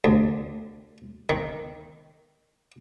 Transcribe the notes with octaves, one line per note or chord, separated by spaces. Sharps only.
D2
D#3